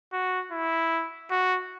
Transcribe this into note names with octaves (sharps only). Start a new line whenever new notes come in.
F#4
E4
F#4